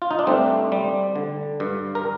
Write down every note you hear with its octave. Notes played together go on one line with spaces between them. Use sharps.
F4
D#4
D4
G2 A3 C4
G3
D3
G2
A#4